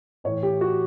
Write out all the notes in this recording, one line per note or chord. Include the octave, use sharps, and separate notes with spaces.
A2 E3 C#5
G4
F#4